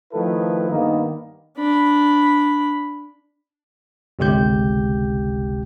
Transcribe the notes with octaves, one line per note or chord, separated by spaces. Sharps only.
D#3 F3 A3 E4 A4 B4
G2 D#3 A#3 B3 D#4
D4 B5
G1 C#2 C3 G4 G6